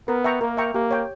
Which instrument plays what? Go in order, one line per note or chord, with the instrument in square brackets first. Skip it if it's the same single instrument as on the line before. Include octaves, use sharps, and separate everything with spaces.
[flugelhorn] B3 [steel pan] A#4
[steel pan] E5 G5 A#5 C#6
[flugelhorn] A#3 [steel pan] A#4
[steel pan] E5 G5 A#5 C#6
[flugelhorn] A#3 [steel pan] G4
[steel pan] C#5 G5